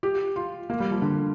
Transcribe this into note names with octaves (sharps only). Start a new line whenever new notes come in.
G4
F4
A#3
G3
F3
D3